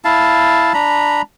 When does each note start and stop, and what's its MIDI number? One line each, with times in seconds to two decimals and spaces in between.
0.05 0.73 64
0.05 0.73 77
0.05 0.73 81
0.74 1.22 62
0.74 1.22 82
0.74 1.22 83